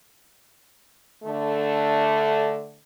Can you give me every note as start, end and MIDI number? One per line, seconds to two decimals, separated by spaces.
1.24 2.79 50
1.24 2.79 57